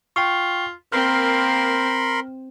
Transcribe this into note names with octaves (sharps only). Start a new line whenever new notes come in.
F4 G5 C#6
A#3 C4 A#4 B5 C6 F6